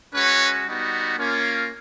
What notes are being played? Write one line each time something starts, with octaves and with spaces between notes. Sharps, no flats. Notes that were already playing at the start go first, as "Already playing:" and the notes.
G#3 C#4 F#4 B4 C#5
G3 B3 D#4 F#4
A#3 C#4 F4